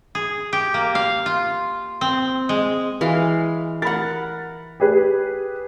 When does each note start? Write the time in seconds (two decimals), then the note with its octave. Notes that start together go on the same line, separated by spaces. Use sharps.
0.15 G#4
0.53 G4
0.74 A#3
0.95 F5
1.26 F4
2.01 C4
2.49 G#3
3.01 E3 G#3 F5
3.82 A#4 F#5 B5 A6
4.80 G4 G#4 B4